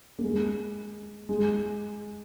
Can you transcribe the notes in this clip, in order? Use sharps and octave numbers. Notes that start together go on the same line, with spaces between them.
A#3
G#3
G#3